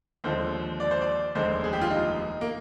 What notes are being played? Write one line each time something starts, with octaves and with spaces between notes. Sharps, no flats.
D#2 D3 F3 G#3 C5
D5
C5
D5
F1 D#2 D3 G#3 C5
G#4
G4
F4
D#4
A#3